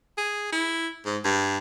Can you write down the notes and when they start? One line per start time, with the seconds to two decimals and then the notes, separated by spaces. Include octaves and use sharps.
0.18 G#4
0.52 E4
1.05 G#2
1.24 G2